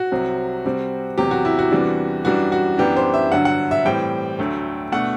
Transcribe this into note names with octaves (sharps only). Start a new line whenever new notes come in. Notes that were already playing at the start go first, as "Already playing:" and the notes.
Already playing: F#4
C2 C3 F#3 C4
C3 G3 C4
E2 C3 F#3 G4
F#4
E4
F#4
E2 C3 E3 G3 D4
F#2 E3 G3 D4 F#4
F#4
F#2 E3 G3 B3 D4 G4
C5
E5
G2 D3 F#3 F#5
F#5
E5
A2 E3 G3 C4 G5
D2 D3 F#3 A3
B2 A3 D4 F#5